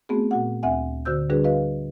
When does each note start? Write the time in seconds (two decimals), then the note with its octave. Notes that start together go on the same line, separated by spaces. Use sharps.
0.09 A3 B3 C4 F#4 G#4
0.31 A#2 F#4 F#5
0.63 D2 C4 E5 F#5 G#5
1.05 D3 F#4 C5 E6 G6
1.30 D3 G3 D4 F#4 G#4 B4
1.44 F#4 B4 D#5 F5